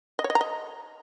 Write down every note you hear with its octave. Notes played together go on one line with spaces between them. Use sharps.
D#5
C#5
D#5
A#5
D#5